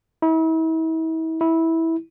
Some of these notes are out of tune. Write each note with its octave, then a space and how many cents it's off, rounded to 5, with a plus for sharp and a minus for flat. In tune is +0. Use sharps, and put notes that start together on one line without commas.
E4 -40
E4 -15